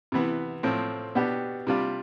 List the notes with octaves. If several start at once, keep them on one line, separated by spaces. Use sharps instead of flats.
C3 E3 B3
A2 F3 C4
B2 B3 D4 G4
C3 G3 D4 F4